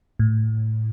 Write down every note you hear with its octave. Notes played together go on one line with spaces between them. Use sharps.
A2